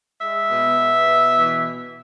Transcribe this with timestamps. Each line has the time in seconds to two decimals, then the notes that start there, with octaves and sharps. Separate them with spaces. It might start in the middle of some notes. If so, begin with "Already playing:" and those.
0.20 G#3 E5
0.48 B2
0.78 B3
1.07 B2
1.36 E3